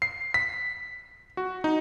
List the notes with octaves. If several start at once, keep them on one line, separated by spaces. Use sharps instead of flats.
C7
B6
F#4
D#4